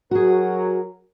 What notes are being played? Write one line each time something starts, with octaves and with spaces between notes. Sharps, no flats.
F#3 F#4 G#4 A#4